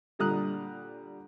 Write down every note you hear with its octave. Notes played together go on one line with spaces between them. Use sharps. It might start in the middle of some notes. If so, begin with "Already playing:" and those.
A#2 D3 G3 A#5 D#6 F#6